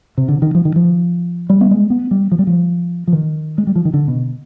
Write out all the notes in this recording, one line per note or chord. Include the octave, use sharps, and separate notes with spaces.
C3
D3
D#3
F3
D#3
F3
G3
B3
G#3
B3
G3
F3
G3
F3
F3
D#3
G#3
G3
F3
D#3
D3
B2